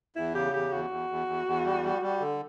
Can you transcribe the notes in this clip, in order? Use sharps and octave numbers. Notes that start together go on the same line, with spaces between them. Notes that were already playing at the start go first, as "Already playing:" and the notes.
E2 E4
C#3 G4
E2 G4
E2 F#4
E2
E2
E2
E2
G3
G3
G3
D3